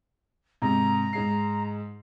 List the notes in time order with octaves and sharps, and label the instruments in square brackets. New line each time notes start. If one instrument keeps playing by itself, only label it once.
[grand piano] G#2 C3 [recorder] A#5
[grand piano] G#2 G#3 C7